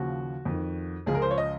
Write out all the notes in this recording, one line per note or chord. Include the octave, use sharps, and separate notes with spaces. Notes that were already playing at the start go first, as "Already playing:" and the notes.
Already playing: D#2 C#3 F3 F#4
F2 D#3
C#2 C#3 F3 G#4
A#4
C5
C#5
D#5